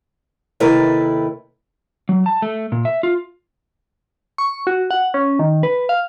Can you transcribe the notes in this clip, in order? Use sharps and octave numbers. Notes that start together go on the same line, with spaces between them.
D#2 C3 A3 E4 A#4 B4
F#3
A5
A3
A#2
E5
F4
C#6
F#4
F#5
C#4
D#3
B4
F5